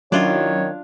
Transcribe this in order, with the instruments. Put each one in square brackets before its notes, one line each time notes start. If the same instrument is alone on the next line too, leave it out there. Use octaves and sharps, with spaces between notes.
[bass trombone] D#3 [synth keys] F#3 C#4 E4 [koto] D4 F4 [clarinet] C#5